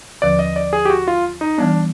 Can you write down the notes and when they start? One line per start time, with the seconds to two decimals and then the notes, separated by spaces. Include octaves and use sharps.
0.22 D#2 D3 F3 D5
0.39 D#5
0.56 D5
0.73 G#4
0.85 G4
0.90 F#4
1.08 F4
1.41 D#4
1.58 E3 G3 B3 D4